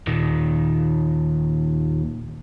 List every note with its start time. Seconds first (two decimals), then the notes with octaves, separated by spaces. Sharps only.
0.07 D#2 A#2 D#3